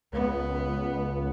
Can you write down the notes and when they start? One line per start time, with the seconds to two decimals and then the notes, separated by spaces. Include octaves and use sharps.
0.13 C#2 B3